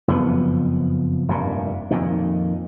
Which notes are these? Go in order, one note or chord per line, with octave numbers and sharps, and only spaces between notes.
F#1 F2 F3 B3
F1 G2 A#2
F2 A#2 D#3